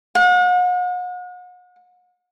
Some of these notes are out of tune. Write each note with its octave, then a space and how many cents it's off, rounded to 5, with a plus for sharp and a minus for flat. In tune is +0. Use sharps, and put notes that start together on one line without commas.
F#5 -40